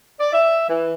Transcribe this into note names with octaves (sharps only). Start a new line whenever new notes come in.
D5
E5
E3